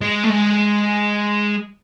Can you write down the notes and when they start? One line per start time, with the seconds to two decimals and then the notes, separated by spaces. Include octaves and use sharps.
0.02 G#3
0.24 A3
0.30 G#3